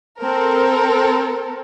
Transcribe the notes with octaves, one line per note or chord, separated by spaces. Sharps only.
C4 A4 A#4